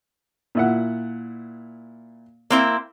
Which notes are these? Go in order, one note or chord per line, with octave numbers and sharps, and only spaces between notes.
A#2 E4 F#5
A#3 C4 E4